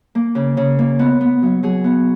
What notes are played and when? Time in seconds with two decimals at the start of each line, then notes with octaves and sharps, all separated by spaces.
0.15 A#3
0.35 C#3
0.57 C#3
0.79 A#3
0.99 B3
1.21 B3
1.42 F#3
1.63 F#3 G#4
1.84 B3